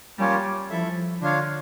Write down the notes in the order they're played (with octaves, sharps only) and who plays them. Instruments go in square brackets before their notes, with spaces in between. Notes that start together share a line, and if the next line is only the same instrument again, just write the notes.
[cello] G3 [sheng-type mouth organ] A#3 C#4 F4 C#5
[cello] F3 [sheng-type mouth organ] E4 A4 E5
[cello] D3 [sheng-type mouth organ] D4 F4 C#5 F5